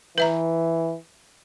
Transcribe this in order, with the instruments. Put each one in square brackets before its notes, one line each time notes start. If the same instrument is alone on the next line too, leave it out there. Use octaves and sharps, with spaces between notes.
[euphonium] E3 [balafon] B4 E5 A#5